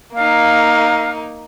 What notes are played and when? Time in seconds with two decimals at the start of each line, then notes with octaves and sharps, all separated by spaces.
0.14 A#3 D#4 F5